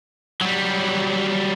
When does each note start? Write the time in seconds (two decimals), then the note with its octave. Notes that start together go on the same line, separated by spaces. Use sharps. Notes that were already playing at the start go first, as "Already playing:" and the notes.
0.41 F#3 G3